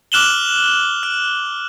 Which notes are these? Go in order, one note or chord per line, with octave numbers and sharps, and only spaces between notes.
D6 F6 F#6 E7 F#7 G7
F6